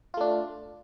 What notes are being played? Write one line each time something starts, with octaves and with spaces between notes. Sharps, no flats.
A3 D4 F4